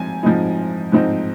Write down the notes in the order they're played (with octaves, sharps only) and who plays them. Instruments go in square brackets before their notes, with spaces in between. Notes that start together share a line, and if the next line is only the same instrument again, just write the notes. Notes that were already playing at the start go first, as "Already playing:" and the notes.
Already playing: [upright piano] G#2 F3 C4 G#5
G#2 F3 C4 D#4
G#2 F3 C4 D#4